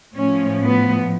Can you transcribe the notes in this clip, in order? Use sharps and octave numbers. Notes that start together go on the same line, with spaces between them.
A2 F3 C#4
B3